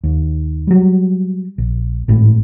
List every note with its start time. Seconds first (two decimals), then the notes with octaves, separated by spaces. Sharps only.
0.03 D#2
0.67 F#3 G3
1.58 A#1
2.08 G#1 A2